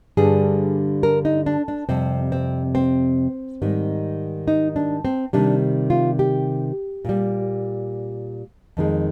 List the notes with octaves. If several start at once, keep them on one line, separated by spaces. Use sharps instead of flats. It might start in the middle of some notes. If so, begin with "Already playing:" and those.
G2 D3 G3 G#4
A#4
D#4
D4
D4
F2 C3 G3 C4
C4
C4
G#2 D#3 G3
D#4
D4
C4
C3 D#3 G3 D4
F4
G4
A#2 G3
F2 D#3 G#3